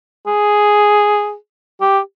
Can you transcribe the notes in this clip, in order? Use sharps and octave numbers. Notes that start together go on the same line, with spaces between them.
G#4
G4